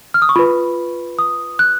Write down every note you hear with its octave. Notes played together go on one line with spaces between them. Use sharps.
F6
D#6
C#6
F4 B4 B5
D#6
F#6